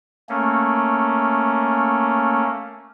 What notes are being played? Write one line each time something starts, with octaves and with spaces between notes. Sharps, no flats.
A3 A#3 C#4